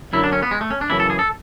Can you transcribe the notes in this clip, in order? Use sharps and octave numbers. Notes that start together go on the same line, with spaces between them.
F#2 D3 F#3 E4
D4
C#4
B3
G#3
A3
C#4
D4
F#2 C#3 E3 E4
A4
G#4
A4